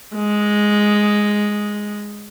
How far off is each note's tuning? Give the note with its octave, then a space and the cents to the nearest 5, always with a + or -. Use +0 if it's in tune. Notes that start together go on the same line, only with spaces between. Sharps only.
G#3 +0